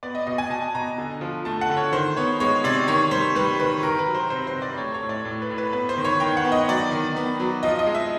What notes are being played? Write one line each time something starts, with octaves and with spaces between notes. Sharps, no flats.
B3 D5
D#5
B2 D#5
G#5
B2 A5
B2 A#5
D3
F3
A3 A5
F#5
D3
C#5
D#3 C5
B3 C#5
G#3 C#5
C3 D5
D#3 C#5
G3 C5
G3 B4
D#3 B4
D#3 A#4
B4
F#3
C5
C3 C5
C5
C3
D5
A3 C#5
C#5
A2
D5
A2
B4
A2
B4
B3 B4
C5
D#3
C#5
D#3 G5
F#5
B3
D#5
F#3 D5
D#3
B3
F#3
F3 D#5
D#5
G#3
E5